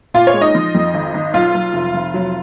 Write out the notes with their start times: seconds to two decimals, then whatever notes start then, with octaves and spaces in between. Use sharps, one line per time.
0.14 A#2 F4 F5
0.27 C#5
0.34 G#3
0.41 D#4 D#5
0.55 F3
0.75 F2
0.94 G#1
1.14 G#1
1.34 B1 F4 F5
1.54 B1
1.74 F1
1.94 F1
2.14 F#3